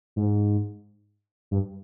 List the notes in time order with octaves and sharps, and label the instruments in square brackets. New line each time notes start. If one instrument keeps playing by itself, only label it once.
[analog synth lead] G#2
G2